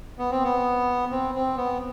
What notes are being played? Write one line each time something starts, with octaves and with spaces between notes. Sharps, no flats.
B3
C4
B3
C4
C4
B3